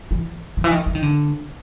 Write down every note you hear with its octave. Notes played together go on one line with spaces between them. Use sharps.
E3
D#3
E3
D#3
E3
D#3
D3